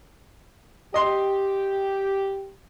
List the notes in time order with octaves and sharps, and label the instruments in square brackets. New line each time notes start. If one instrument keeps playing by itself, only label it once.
[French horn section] G4 [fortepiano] D#5 C6